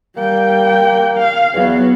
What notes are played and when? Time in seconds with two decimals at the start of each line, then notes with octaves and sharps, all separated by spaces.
0.17 G3 A#3 G5
1.18 F5
1.54 E2 F#3 B3